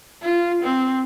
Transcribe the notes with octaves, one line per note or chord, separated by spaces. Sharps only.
F4
C4